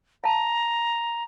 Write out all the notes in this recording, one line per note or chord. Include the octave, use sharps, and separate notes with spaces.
F5 A5 A#5